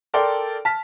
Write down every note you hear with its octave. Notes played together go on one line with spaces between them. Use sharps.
A4 A#4 D5 G5 C6
A5 F6 B6